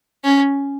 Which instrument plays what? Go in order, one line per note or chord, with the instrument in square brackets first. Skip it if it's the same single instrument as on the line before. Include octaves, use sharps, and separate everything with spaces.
[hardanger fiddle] C#4